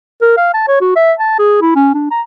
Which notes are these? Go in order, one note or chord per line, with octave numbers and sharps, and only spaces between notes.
A#4
F5
A5
C#5
F#4
E5
A5
G#4
E4
C#4
D4
A#5